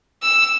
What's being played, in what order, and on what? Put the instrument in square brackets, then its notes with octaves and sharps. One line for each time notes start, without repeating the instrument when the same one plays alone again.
[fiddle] E6